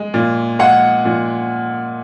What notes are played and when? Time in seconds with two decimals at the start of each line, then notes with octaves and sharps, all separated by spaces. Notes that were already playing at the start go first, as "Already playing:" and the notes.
Already playing: G#3
0.14 A#2
0.59 G#3 F#5
1.05 A#2